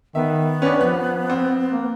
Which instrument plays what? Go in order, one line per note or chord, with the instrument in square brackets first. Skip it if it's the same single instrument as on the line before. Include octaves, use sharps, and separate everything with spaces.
[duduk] D#3 [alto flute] B3 [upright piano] E5
[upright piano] C#4 D4 [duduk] B4
[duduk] F3 [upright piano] F#6
[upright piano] C4
[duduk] A#3